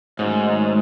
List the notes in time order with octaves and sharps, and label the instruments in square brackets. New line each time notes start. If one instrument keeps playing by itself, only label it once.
[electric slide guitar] G#2 [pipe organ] D#3 F#3 A3 C#4